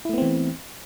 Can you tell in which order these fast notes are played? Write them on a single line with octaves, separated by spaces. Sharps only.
E4 A3 B3 C4 E3